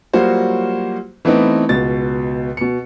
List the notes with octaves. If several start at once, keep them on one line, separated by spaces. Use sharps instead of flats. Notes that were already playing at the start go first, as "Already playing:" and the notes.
F#3 G3 A#3 F4 F#4 C5
E3 A3 B3 C4 D#4
C#2 B2 A6
B2 C#7